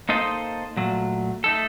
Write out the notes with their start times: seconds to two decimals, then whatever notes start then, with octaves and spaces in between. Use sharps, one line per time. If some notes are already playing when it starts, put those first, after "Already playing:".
0.09 A#3 D#4 A4 C5 D#5
0.77 A#2 F#3 A3
1.44 A3 D#4 A4